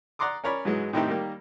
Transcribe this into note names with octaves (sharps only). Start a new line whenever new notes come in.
D5 F#5 A#5 C6 D6 D#6
C#4 A#4 C#5 D5 B5
G#2 E3 F#3 G#3
A2 D#3 C4 D#4 E4 G4
D#3 G3 A#3 G4